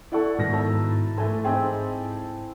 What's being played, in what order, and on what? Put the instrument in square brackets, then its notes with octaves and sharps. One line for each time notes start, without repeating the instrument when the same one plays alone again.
[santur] E4 A4 [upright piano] D5 F#5 C#6
[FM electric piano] G#2 [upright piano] B2 D#3 A#6
[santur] E5 A5 A#5
[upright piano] E3 A3 [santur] G#5 A5 C6
[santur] C4 [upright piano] D#4 G4 G#4